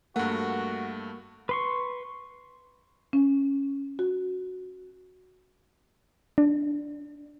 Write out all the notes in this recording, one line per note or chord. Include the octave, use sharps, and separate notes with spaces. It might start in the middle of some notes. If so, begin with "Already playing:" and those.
G2 A3 A#3 F#4 A#4 F#5
B4 C6 C#6
C#4
F#4
D4